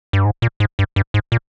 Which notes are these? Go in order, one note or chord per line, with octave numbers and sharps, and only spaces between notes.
G2
G#2
A#2
G#2
G2
G2
G#2
A#2